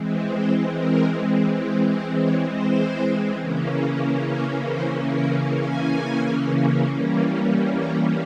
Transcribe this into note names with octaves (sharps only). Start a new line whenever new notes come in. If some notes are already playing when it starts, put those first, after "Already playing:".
Already playing: E3 G#3 C4
C5
A#4
C5
C5
C#5
C5
C#3 E3 A#3 C#4
A#4
C5
A#4
G#5
E3 G3 A#3 C#4
A#5